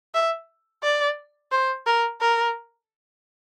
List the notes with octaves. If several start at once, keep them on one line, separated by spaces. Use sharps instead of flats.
E5
D5
C5
A#4
A#4